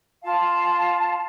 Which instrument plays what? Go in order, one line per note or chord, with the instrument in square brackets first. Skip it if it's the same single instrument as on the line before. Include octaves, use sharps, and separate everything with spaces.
[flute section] F4 F5 A5